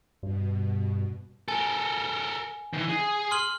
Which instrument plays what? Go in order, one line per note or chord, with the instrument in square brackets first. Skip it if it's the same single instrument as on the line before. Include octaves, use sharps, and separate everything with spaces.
[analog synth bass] G2 [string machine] B2
[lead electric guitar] A4 A#4 [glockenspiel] G#5
[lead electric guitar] D#3 E3
G#4
[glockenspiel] C6 F6 F#7